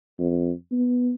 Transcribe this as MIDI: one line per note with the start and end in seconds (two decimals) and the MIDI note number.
0.19 0.52 41
0.72 1.15 59